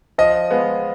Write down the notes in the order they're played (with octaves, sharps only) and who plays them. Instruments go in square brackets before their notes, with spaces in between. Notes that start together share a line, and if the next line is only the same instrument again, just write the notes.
[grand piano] F3 D#5
G#3 B3 F4